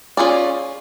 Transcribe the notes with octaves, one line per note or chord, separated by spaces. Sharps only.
C#4 F4 G#4 D5